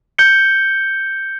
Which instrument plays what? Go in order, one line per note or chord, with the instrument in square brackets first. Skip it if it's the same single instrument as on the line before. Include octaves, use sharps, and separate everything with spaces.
[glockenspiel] G6 C#7 G7